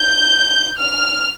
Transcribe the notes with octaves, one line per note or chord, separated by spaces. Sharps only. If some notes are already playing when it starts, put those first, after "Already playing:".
Already playing: G6
F6